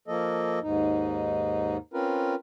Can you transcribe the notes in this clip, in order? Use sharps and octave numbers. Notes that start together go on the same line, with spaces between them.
F3 A#3 A4 D#5
D#2 G#2 D#4
C4 C#4 F4 A#4 B4